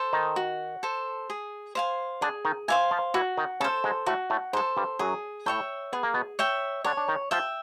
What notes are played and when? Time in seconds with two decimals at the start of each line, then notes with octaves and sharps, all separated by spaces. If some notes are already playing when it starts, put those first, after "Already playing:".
Already playing: A4 C5
0.13 D#3 D#4
0.36 F#4
0.83 A4 C5
1.30 G#4
1.75 C5 F5 G#5
2.21 D3 D4 G#4
2.45 D#3 D#4
2.68 E3 E4 C5 F5 G#5
2.91 F3 F4
3.14 E3 E4 F#4
3.37 D#3 D#4
3.60 C#3 C#4 A4 C5
3.84 G#2 G#3
4.06 A2 A3 F#4
4.30 A2 A3
4.53 G#2 G#3 C5
4.57 A4
4.77 G2 G3
4.99 F#2 F#3 G#4
5.46 A2 A3 C#5 E5 G5
5.93 B3 G#4
6.03 A#3
6.14 B2 B3
6.39 C#5 E5 G5
6.84 D3 D4 C#5
6.97 D4
7.08 D#3 D#4
7.31 F3 F4 E5 G5